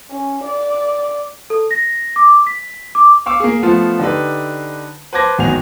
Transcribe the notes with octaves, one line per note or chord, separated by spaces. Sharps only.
C#4
D5
A4
A#6
D6
B6
D6
F5 C#6 D6 E6
A#3 G#4
F3 A3 B3 F4
D3 D#4 G4 B4
B4 C5 A5 D6 G#6 A#6
G#1 E2 D#3 F#4 G#5 F7